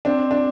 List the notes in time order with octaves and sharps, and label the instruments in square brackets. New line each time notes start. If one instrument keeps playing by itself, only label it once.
[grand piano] C4 [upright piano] D4
[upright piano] D4